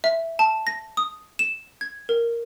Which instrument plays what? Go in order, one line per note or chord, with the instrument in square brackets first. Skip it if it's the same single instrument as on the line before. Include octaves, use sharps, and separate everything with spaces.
[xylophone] E5
A5
A#6
D#6
E7
G#6
A#4